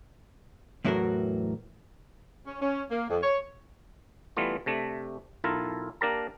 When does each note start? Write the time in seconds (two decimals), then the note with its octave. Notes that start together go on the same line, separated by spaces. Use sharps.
0.85 E2 A2 E3 F#3 F#4 A#4
2.46 C#4
2.62 C#4
2.91 A#3
3.09 F2
3.23 C#5
4.37 E3 G3 A3 B3 F4
4.66 C3 A3 D4
5.44 B1 E4 F4 A4 A#4
6.01 A#3 D4 G4 A#4 A5 A#5